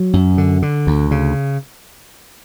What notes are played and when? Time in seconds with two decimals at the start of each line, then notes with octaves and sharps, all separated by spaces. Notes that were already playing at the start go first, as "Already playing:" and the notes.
Already playing: F#3
0.13 F#2
0.38 D3
0.62 D3
0.87 D2
1.11 C#3